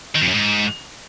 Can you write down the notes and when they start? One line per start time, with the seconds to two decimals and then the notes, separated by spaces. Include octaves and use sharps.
0.15 D#3
0.22 F2
0.28 F#2
0.34 G#2